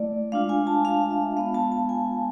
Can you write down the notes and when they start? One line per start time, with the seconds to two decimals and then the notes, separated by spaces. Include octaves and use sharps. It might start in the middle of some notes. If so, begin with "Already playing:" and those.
Already playing: A3 E4 D5
0.32 G#3 D4 F4 F5
0.49 G#5
0.67 A5
0.85 F5
1.11 E5
1.37 G#3 B3 F4 F5
1.55 A5
1.72 A5
1.89 G#5